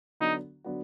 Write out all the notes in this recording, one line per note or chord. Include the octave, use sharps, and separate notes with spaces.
D3 F#3 B3 D4 D#4 F#4
D3 F#3 B3 D4 F#4